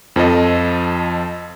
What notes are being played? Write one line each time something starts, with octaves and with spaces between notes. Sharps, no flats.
F2 F3 A4 D#5